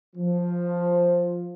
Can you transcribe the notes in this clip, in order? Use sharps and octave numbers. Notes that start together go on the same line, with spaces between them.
F3